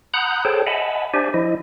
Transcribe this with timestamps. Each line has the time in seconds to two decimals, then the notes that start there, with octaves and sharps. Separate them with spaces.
0.14 F#5 A#5 B5 D#6 F#6 G6
0.45 G#4 A4 C5 C#5 G5 A5
0.67 D#5 E5 F#5 G#5 A5 B5
1.14 D4 G4 C5 D5 E5 G#5
1.34 F3 E4 D#5